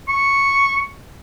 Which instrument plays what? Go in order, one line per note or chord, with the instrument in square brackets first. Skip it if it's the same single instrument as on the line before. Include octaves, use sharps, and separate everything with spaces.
[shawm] C#6